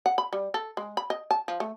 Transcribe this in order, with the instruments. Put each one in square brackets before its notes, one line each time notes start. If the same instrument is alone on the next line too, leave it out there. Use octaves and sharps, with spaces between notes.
[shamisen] F#5
B5
G3
A4
G#3
B5
D#5
A5
F3
A3